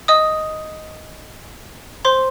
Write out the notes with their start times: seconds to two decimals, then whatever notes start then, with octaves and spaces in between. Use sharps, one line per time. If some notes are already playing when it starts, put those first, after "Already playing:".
0.08 D#5 D#6
2.05 C5 C6